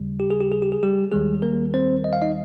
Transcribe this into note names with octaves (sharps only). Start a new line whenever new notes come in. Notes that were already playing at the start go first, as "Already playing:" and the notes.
Already playing: D#2 C#3 G3
G4
G#4
G4
G#4
G4
G#4
G3 G4
D#2 D#3 G3 G#3 G#4
A#3 A#4
C4 C5
D#5
F5
D#4 D#5